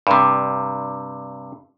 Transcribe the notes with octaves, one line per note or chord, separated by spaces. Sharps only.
G2 C3